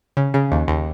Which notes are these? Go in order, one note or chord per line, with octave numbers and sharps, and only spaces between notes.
C#3
C#3
D#2
D#2